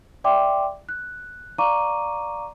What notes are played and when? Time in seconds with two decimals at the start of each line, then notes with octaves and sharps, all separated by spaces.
0.24 D5 E5 G5 C6 D6
0.89 F#6
1.58 D5 F5 A#5 C#6 D6 D#7